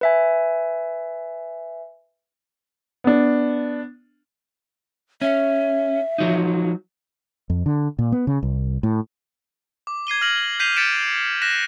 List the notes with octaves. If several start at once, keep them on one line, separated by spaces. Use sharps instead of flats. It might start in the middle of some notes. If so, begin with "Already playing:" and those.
B4 E5 G#5
B3 D4
C#4 E5
F3 F#3 D#4
F2
D3
A#2
B3
C#3
C2
A2
D6
G#6 C7 D#7 G7
F6 A#6 F#7
G6 B6 C7 D#7 F7
G6 A6 B6 C#7 D7 E7
F#6 A#6 B6 E7